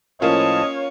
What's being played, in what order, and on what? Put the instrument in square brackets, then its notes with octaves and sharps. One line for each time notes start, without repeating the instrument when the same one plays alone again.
[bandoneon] A2 F3 A5 [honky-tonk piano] A#3 C#4 F4 [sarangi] C#5 [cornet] D#5